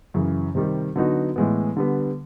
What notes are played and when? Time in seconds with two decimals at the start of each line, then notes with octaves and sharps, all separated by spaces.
0.14 F#2 C#3 E3
0.55 C3 D#3 G3
0.96 D3 F#3 B3 D#4 F#4
1.36 A2 E3 G#3 B3
1.77 D3 G3 B3